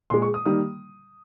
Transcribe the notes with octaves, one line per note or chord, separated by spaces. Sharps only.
A#2 G#3 C6
C#6
D#6
D#3 G3 A#3 D#6